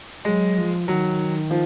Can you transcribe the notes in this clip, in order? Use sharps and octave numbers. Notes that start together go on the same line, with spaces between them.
F#3 G#3
F3
D#3 F#3
F3